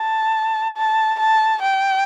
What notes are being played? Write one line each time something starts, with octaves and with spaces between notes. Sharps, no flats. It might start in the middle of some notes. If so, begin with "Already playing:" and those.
Already playing: A5
A5
A5
G5